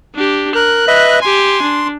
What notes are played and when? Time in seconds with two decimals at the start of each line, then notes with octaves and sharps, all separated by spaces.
0.15 D4 G4
0.55 A#4 F#6
0.87 B4 D#5 E5
1.22 G4 G#5 C6
1.62 D4